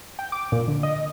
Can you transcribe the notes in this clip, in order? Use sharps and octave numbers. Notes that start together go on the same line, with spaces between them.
G5
D6
A#2
D3
D#5